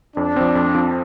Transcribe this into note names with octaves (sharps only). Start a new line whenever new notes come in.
F2 D4
F3 C4
F2
F3 C4